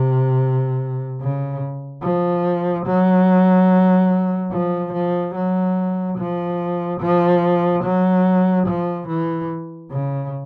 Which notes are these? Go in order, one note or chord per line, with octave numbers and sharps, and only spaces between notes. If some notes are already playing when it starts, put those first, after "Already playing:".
Already playing: C3
C#3
F3
F#3
F3
F3
F#3
F3
F3
F#3
F3
E3
C#3